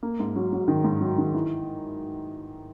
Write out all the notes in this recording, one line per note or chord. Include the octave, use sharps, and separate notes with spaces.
A#3
G#2
F#3
F#3
D#3
G#2
F#3
D#3
E3